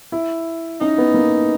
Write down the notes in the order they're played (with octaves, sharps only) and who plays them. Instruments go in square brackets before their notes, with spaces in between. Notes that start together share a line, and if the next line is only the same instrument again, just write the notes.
[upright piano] E4
[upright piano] C#4 [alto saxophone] D#4
[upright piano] B3
A#3